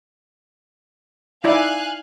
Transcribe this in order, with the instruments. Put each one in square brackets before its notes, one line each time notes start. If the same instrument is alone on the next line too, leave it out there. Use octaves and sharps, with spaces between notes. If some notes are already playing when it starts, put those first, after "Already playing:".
[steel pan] D#4 E4 D5 [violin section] F5 G#5 F#6